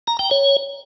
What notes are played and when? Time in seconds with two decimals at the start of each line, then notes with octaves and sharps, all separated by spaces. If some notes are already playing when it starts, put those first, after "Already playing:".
0.07 A#5
0.19 G5
0.31 C#5